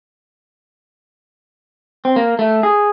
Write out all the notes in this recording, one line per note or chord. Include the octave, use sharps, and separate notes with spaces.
C4
A#3
A3
G#4